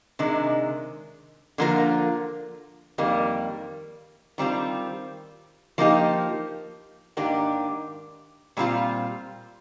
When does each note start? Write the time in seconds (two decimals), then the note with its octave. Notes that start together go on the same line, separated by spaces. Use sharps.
0.19 C3 D#3 G#3 D4
1.58 D3 F3 A#3 F4 A#4
2.98 F2 D#3 G3 A#3
4.38 D#3 G3 C4 F4
5.78 F3 A#3 D#4 G4
7.17 G#2 D#3 A#3 D4 G4
8.57 A#2 G3 C4 F4